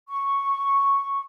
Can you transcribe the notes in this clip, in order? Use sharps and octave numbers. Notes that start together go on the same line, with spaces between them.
C#6